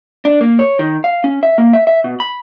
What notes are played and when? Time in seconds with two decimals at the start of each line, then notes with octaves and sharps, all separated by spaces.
0.25 D4
0.41 A#3
0.59 C#5
0.79 D#3
1.04 F5
1.24 C#4
1.43 E5
1.58 A#3
1.73 E5
1.87 E5
2.04 B2
2.20 B5